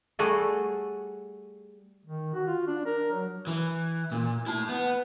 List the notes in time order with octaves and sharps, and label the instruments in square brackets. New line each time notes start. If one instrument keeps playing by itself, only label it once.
[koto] G3 A3 F#4 G#4 A4
[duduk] D#3
F#4
F4
D4
A#4
F#3
[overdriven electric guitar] E3
A#2
E4 A5
B3